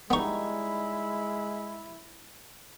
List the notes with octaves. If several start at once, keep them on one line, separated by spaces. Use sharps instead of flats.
G3 G#3 B3 D#4 E4 C#6